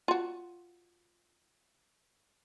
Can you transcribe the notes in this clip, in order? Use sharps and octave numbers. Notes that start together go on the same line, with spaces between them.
F4 F#4